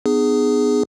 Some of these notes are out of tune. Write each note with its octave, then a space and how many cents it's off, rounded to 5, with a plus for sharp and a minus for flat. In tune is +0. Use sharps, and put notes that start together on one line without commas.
B3 +15 D#4 -45 G#4 +0